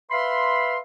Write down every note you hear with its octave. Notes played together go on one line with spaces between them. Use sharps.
B4 E5 F5 B5 C6